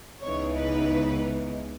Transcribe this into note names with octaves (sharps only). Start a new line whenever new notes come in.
C#2 C#3 E3 B3 D#4 C#5
B4